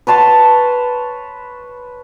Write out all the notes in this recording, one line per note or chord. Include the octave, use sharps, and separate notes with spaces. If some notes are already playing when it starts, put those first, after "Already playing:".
B4 C#5 A5 C6